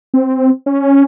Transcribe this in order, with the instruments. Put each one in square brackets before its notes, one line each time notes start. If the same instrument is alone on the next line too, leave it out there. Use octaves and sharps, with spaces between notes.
[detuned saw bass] C4
C#4